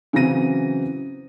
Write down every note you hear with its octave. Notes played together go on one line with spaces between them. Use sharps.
C#3 E3 F#3 C4 A#6 D#7